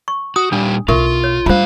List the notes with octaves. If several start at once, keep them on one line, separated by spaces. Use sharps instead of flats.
C#6
F#4 D#6
A#2 G3 D4 G4
B1 E4 F4 A#4 E5 C#6
C#5
A2 G3 D4 F4 C5 F5